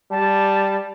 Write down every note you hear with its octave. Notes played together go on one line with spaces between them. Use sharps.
G3 A5